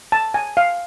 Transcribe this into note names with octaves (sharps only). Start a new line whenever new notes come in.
A5
G#5
F5